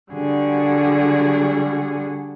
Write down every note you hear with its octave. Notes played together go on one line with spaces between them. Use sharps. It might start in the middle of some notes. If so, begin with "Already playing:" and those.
D3 G3 F#4 G#4